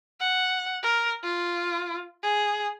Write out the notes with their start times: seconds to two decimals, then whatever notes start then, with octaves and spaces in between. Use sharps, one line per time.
0.20 F#5
0.83 A#4
1.24 F4
2.23 G#4